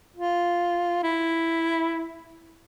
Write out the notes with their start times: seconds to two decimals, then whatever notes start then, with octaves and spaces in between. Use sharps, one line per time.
0.16 F4
1.03 E4